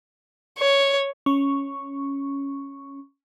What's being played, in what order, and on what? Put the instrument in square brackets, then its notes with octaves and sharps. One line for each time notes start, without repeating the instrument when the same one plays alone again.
[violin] C#5
[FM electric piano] C#4 C#6